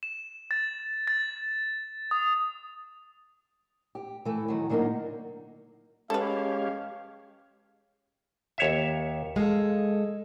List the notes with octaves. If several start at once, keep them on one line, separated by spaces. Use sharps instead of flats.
E7
A6
A6
D#6
G4
E3 A3
D#3 F#3
D3 F#3 A#3 C#4 D#4
G#3 C#4 G4 A4 B4 C#5 F5
D#2 C#5 E5
G#3 A4 F5